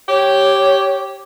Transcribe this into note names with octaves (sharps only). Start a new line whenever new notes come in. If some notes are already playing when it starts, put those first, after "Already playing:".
G4 C#5